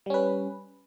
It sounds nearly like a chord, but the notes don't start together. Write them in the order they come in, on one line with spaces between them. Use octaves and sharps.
G3 C#4 B4